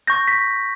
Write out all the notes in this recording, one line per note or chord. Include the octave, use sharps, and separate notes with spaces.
C#6 G6 A#6
B6